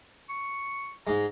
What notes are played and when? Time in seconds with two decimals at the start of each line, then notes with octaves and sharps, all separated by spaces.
0.29 C#6
1.07 G#2 G#3 A#5